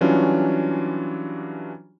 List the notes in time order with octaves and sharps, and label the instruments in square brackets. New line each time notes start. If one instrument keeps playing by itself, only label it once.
[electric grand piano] E3 F#3 G3 C#4 D4 F4